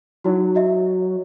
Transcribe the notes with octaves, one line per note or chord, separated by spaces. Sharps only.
F#3 D#4 E4 F#4
F#4 D#5 E5